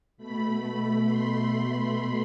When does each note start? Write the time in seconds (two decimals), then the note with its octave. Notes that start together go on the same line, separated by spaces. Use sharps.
0.17 B2 A3 B5
0.77 B5
1.06 C6
1.93 B5